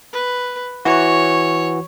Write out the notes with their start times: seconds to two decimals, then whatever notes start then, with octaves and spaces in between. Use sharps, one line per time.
0.13 B4
0.85 E3 F#4 C#5